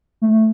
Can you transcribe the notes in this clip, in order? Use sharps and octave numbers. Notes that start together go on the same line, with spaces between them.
A3